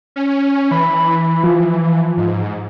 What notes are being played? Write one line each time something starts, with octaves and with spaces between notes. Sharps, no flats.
C#4
E3 B5
F3
G#2